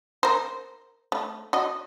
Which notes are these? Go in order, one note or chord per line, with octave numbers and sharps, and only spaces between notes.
A#4 C5
A3
F#4 D#5